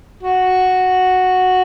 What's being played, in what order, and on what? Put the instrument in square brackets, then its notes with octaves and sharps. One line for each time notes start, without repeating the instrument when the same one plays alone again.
[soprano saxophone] F#4